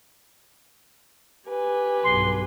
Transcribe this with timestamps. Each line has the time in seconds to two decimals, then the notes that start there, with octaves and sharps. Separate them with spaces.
1.48 G4 B4 G#5
2.04 B1 G2 C6